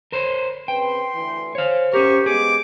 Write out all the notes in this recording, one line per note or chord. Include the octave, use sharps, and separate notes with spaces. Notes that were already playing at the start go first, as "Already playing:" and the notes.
A#4 C5 C#5
C#3 C4 B4 G5 C6
D2 E3
C5 C#5 F5
C#4 G4 A#4 C#6
G2 G#3 B3 G#4 D6